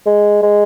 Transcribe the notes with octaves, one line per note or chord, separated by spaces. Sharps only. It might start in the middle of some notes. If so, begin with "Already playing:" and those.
G#3
G#3